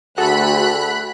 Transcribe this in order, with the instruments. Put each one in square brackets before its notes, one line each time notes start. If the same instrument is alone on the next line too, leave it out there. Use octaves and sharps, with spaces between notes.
[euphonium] D2 [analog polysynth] F#4 G#4 A4 [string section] B5 F#6